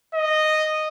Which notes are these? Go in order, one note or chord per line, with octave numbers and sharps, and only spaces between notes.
D#5